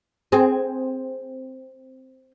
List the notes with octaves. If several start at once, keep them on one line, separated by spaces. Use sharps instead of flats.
C4 G#4